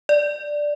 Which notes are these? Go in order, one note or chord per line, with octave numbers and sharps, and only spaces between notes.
D5